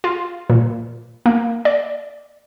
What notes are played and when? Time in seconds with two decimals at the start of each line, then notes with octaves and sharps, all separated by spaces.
0.04 F4
0.50 A#2
1.26 A#3
1.65 D5